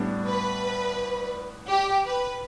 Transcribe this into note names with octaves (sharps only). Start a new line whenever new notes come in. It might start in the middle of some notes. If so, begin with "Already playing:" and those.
Already playing: A2 G3 B3 D4
B4
G4
B4